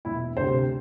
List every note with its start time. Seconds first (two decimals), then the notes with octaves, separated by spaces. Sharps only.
0.05 E1 E4
0.37 D2 C3 C5